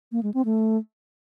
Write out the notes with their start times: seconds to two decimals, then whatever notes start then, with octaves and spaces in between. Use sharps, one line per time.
0.12 A#3
0.23 G#3
0.34 C4
0.45 A3